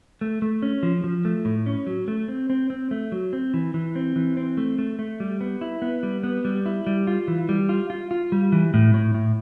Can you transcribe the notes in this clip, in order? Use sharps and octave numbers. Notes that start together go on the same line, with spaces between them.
A3
A3
C#4
F3
F3
A3
A2
C#4
F#3
A3
C4
C4
C4
A3
F#3
C4
E3
E3
C4
E3
C4
A3
A3
A3
G3
B3
E4
B3
G3
B3
G3
E4
G3
F4
E3
G3
F4
F4
F4
G3
E3
A2
A2
A2